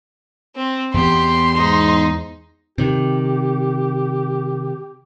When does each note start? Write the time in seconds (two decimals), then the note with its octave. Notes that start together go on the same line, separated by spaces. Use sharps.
0.56 C4
0.94 E2 B3 G4 C6
1.56 G#2 D#4
2.78 C3 D#3 G4